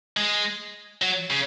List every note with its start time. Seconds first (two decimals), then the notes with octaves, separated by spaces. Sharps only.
0.17 G#3
1.02 F#3
1.30 C#3